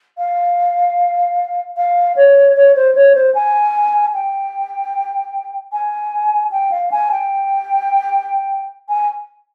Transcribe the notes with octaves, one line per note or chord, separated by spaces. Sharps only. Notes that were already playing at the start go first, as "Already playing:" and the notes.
F5
F5
C#5
C#5
C5
C#5
C5
G#5
G5
G#5
G5
F5
G#5
G5
G#5